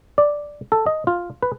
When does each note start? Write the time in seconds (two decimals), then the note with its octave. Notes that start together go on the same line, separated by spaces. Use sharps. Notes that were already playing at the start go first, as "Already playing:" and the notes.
0.18 D5
0.72 A4
0.86 D#5
1.07 F4
1.43 B4